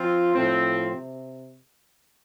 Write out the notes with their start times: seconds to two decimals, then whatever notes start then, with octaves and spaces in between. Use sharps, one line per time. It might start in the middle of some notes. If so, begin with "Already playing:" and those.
Already playing: F3 C4 F4
0.34 A2 F3 C4
0.92 C3